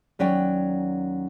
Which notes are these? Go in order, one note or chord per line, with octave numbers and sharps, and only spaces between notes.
D#2 F#3 C#4 D5 G5